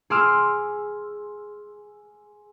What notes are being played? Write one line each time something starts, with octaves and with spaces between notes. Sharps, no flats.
G#4 C6 D6 E6 F6